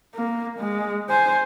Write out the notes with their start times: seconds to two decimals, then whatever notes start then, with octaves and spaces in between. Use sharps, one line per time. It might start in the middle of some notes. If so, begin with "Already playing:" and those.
0.15 A#3
0.59 G#3
1.09 C5 G#5